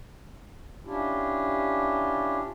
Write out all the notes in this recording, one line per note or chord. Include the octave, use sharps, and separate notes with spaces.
C#4 D4 E4 F4 G4